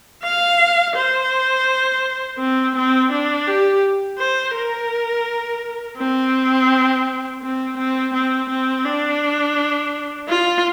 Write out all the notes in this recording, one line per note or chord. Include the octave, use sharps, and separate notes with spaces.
F5
C5
C4
C4
D4
G4
C5
A#4
C4
C4
C4
C4
C4
D4
F4